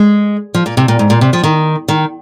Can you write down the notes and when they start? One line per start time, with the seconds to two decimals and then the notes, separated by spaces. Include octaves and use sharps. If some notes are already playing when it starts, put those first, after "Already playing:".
Already playing: G#3
0.55 F3
0.66 A#2
0.77 C3
0.88 A#2
0.99 G#2
1.10 A#2
1.21 C3
1.33 F3
1.44 D#3
1.88 D#3